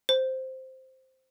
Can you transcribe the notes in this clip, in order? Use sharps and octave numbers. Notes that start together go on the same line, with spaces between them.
C5